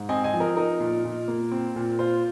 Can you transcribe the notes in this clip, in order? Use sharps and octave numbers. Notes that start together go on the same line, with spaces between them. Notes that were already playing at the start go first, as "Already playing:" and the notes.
Already playing: G#2
C4 D#5 G#5
D#5 G#5
F3
A#4 D#5
D#4 A#4
A#2
A#2
A#3
C4
A#2
F4 C5